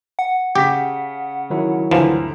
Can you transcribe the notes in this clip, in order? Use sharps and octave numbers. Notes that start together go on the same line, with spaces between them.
F#5
C#3 G4 B6
D#3 F#3 E4
G1 D2 E3 F3 E7